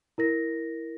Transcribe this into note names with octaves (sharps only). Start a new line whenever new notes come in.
E4 A#4 A#6